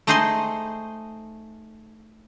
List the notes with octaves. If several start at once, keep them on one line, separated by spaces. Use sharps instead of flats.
A3 D#4 G#4 C5 D#5 C6